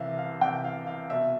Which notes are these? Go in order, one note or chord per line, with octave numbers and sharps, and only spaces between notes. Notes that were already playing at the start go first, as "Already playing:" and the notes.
Already playing: C2 C3 E3 E5 F5
F5
C2 C3 E3 G5
F5
F5
C2 B2 E5